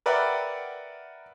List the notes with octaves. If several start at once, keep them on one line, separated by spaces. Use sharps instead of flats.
A#4 B4 D5 E5 F#5 G5